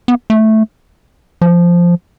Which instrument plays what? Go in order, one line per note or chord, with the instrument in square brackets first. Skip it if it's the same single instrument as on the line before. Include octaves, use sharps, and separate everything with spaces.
[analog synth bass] B3
A3
F3